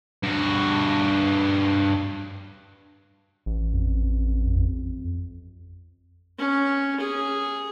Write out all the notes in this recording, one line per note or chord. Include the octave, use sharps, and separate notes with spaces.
G2 F#4
A1
F2
F2
C#4
G#4